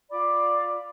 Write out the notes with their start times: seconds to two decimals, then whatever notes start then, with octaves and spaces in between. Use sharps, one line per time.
0.11 F4 D5 B5 D6